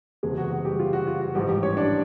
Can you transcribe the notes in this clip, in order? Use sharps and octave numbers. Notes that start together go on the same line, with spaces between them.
F#1 E2 C3 G#3 G#4
F#4
F#4
G3 G4
F4
F#4
F4
F#4
A1 G#2 F3 G3 G4
G3 G4
C#4 C#5
D4 D5